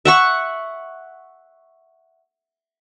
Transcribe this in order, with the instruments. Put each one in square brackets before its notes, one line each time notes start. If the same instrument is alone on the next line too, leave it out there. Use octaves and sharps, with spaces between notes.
[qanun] E5 F#5 C#6